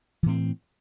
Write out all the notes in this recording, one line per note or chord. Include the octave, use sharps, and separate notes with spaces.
A2 E3 C4